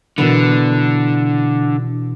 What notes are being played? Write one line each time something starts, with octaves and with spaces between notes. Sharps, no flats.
B2 D3 E3 B3